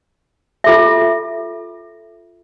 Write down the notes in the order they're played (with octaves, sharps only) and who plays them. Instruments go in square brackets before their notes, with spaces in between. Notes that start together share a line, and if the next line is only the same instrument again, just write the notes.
[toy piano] F4 A4 E5